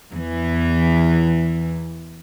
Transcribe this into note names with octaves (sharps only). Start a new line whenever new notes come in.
E2 E3